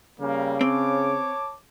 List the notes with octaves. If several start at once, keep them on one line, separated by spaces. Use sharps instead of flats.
C#3 G3 A#3
C4 C#5 A5 D6